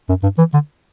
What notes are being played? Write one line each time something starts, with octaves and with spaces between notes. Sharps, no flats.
F#2
G2
E3
D3